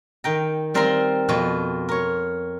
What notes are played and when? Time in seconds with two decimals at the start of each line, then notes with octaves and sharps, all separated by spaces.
0.24 D#3 G5 A#5
0.74 G3 C4 A#4 F5 A#5 C6
1.29 F2 B2 F4
1.89 A#4 C#5